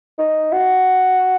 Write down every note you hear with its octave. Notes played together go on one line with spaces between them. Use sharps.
D#4
F#4